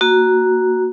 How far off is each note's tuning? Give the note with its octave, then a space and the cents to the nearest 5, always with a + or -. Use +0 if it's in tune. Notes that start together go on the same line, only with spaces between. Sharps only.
A#3 +0 F#4 +0